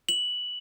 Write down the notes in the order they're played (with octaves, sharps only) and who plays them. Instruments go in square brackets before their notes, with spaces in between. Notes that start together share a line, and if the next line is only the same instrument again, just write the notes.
[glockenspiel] F#7